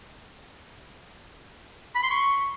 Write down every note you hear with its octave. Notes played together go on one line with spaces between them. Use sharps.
B5
C6
C#6